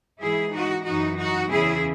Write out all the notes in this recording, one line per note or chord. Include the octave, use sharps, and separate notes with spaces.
G#2 E3 E4 G#4
D#4 F#4
F#2 E3 D#4 F#4
D#4 F#4
E2 C#3 E3 E4 G#4